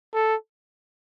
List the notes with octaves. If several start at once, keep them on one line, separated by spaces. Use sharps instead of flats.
A4